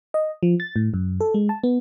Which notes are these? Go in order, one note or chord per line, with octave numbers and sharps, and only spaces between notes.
D#5
F3
A6
A2
F#2
A4
G#3
A5
B3